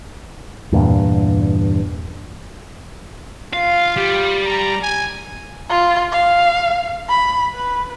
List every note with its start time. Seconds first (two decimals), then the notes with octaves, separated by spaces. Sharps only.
0.72 E2 G2 A#2
3.53 F4 F5
3.97 G3
4.45 A#5
4.83 G#5
5.69 F4
6.12 F5
7.08 B5
7.51 B4